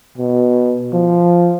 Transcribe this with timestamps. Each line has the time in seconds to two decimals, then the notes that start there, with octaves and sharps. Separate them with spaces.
0.18 B2
0.93 F3